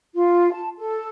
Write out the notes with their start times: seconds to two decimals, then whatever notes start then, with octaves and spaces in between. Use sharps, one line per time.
0.14 F4
0.53 A5
0.77 A4